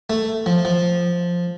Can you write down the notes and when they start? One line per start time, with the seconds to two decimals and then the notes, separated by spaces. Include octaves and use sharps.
0.10 A3
0.46 F3
0.65 F3